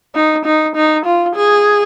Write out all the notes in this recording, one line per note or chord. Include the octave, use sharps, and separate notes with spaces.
D#4
D#4
D#4
F4
G#4